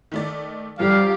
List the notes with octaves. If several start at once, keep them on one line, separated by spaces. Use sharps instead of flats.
D#3 A3 D5
F#2 F3 G3 G4 A4 F5